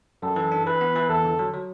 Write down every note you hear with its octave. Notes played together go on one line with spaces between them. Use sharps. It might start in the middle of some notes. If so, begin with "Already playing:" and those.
F#2 A4
E3
D4
E3 B4
B3
E3
E2 A4
D3
F#3
F#3